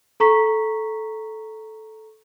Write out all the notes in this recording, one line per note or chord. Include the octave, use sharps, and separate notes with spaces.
A4 A#5 C#6 B6